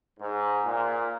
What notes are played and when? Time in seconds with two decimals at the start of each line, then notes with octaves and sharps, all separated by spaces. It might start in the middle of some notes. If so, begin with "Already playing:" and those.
0.20 G#2
0.65 A#2